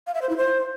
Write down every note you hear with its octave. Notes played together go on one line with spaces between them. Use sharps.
F5
E5
C5
E4
C5